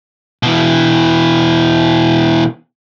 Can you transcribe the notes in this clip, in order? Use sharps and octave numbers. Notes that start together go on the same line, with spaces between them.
B2 E3